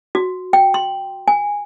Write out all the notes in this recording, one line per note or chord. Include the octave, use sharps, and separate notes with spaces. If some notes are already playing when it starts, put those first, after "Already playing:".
F#4
G5
C6
G#5